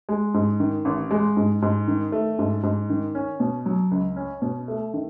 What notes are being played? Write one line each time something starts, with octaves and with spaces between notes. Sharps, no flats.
G#3
G#2
D#3
A1
G#3
G#2
G#2
D#3
A3
G#2
G#2
D#3
C#4
B2
F#3
C#2
C#4
B2
A3
D#3